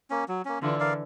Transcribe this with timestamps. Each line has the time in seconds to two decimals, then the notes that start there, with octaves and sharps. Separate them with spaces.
0.10 A#3 C#4
0.28 F#3
0.45 A#3 C#4
0.62 D3 E3 F4
0.80 A#4 D5 F5